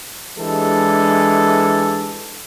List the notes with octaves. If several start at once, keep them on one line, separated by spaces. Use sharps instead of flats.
E3 G#3 D4 G4 A4